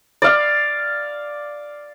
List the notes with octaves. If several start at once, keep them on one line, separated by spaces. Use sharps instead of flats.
D5 F5